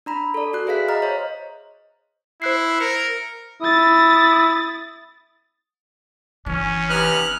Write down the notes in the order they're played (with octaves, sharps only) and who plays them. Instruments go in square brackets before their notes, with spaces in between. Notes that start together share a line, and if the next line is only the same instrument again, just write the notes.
[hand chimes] D4 A#5 B5
A4 D5
F#4 F#6
G#4 B4 E5 F5 B6
D#5 A#5 F6
C5 C#5
[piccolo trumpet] E4 [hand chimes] C5 F#6 C7
[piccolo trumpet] A#4 [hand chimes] C#7
[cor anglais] E4 [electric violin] D#6 A6
[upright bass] G1 E3 [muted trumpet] C#4
[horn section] C3 B3 D#4 [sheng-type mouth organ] F6 F#6